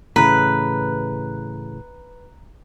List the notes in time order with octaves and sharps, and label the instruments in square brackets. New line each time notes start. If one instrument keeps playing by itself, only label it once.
[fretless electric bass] A2 C#3 E3 [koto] B4 [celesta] A#5 F#6